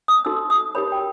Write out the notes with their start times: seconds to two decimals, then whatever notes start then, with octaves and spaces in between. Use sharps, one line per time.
0.08 D#6
0.25 D#4 F#4 A4 E6
0.50 D#6
0.75 D#4 G4 A#4 C#5 B5
0.92 G5